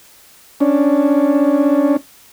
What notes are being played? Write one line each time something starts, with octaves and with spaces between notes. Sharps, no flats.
C#4 D4